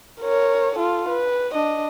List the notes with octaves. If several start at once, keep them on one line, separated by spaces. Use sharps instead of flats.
A#4 C#5
F4 A4
B4
D4 D#5